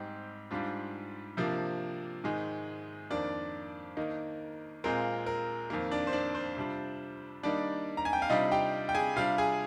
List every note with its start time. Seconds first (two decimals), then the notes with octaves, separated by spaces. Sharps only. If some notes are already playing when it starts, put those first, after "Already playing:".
Already playing: G#2 G3 C4 D#4 G4
0.51 G#2 G3 D4 F4
1.37 C3 F3 A#3 D4
2.24 G#2 D#3 G#3
3.10 F2 D#3 A#3 D4 D5
3.97 D#3 A#3 D#4
4.84 A#2 G#3 C4 F4 A#4
5.26 A#4
5.70 F2 D#3 A#3
5.91 D4 D5
6.07 C5
6.13 D4 D5
6.35 C5
6.56 C3 G3 D4 F4
7.43 D#3 G3 A#3 D4 D#4 D5
7.97 A#5
8.05 G#5
8.13 G5
8.22 F5
8.30 C3 G3 D4 D#4 F4 D#5
8.52 G4 G5
8.89 G5
8.95 G#4 G#5
9.16 C3 G3 D4 F4 F5
9.38 G#4 G#5